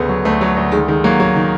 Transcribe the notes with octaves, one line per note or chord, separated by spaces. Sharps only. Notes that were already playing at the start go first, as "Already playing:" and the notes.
Already playing: D2 C#3 B3
F#3
D2 A3
F#3
D2
D#3 G#3
D#3 G#3
F#3 A#3
F#3
D#3